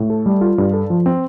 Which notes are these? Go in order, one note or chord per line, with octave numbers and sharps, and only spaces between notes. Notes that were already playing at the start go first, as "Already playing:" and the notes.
Already playing: A2
A4
G3
F4
G2
A4
F3
C4